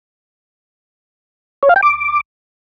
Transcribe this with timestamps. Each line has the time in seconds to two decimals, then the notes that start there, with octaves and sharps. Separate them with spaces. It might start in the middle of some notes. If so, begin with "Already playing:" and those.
1.63 C#5
1.69 F5
1.76 G5
1.83 D6